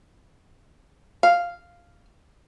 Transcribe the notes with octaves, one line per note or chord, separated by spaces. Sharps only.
F5